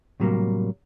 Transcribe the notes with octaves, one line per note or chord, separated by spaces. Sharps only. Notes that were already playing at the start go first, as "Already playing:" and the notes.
A2 C3 F#3 G3 A3 A#3